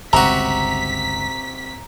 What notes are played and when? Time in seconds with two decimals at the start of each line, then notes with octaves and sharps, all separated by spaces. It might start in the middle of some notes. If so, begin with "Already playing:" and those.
0.13 G1 C#2 C3 F#4 A#5 B6